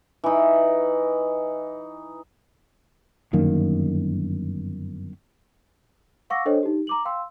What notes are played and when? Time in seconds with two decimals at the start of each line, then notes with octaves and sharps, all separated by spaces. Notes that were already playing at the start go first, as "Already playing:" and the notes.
0.24 E3 D#4
3.33 G1 F#2 D#3 A#3
6.30 F5 F#5 C#6 D6 E6 A#6
6.45 D4 A4 C5 C#5 D#5 G5
6.63 D#4 G4
6.87 A#5 D6 F#7
7.05 F5 G5 C6 E6